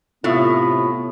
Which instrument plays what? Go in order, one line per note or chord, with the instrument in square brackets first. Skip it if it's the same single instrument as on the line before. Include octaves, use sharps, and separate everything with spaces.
[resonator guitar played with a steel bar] A2 [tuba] C3 [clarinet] B3 [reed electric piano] F4 E5